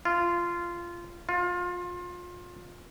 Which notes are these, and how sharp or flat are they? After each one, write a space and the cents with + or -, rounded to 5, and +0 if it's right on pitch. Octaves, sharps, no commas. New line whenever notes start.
F4 -15
F4 +25